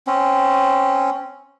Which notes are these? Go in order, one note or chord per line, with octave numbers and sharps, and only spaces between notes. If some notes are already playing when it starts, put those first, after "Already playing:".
C4 C#4